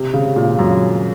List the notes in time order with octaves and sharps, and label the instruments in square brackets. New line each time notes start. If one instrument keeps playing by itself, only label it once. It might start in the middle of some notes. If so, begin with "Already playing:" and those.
Already playing: [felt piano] C3
C#3
A#2
F#2